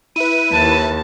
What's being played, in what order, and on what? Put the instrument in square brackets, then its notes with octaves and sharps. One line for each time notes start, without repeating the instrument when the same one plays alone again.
[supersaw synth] E4 B4 [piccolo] D#7
[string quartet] D#2 [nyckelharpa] A5